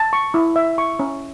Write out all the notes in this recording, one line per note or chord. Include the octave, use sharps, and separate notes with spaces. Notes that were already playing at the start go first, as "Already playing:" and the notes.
Already playing: A5
C#6
E4
E5
C#6
C#4